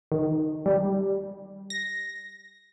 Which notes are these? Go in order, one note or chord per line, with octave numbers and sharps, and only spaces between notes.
D#3
G3
A#6